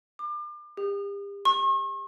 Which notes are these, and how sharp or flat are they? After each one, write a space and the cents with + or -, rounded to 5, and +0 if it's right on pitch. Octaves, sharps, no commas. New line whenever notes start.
D6 +35
G4 +40
C#6 -45